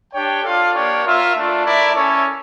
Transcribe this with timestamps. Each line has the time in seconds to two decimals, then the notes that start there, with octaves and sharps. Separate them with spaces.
0.12 D4 G4 C#5 G5
0.42 F4 A4 D5 F5
0.73 A#3 D4 G4 C#5
1.04 F4 A#4 E5
1.34 A3 D4 F4
1.65 A3 E4 A#4 D5
1.95 C#4 E4 A4 C#5